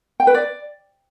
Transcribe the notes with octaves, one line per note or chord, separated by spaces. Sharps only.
G5
B4
D5